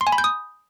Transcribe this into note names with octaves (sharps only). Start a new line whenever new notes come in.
C6
G#5
B5
G6
D#6